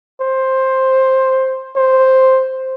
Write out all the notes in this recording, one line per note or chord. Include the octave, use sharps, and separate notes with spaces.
C5
C5